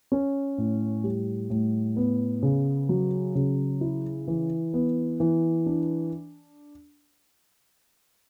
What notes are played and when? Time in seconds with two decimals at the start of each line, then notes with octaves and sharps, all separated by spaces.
0.12 C#4
0.58 A2
1.04 G3
1.50 A2
1.96 B3
2.43 C#3
2.89 F#3
3.35 C#3
3.81 E4
4.28 E3
4.74 B3
5.20 E3
5.66 D4